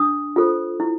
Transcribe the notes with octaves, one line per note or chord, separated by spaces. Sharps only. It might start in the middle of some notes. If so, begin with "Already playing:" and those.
Already playing: D4 D#6
F4 A4 C5
E4